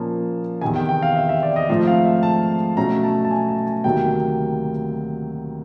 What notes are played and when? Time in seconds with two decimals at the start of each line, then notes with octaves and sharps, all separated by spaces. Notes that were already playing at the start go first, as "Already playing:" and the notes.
Already playing: A#2 F3 A#3 C#4 A5
0.61 E2 C3 D#3 G#5
0.76 G5
0.89 G5
1.02 F5
1.16 E5
1.29 E5
1.43 D5
1.56 D#5
1.69 G#2 F3 A3 C4 E5
1.87 F5
2.05 E5
2.23 A5
2.77 B2 F#3 A3 C#4 A#5
3.03 A5
3.25 A5
3.31 G#5
3.49 A5
3.67 G#5
3.84 D2 C3 D#3 F#3 A#3 G5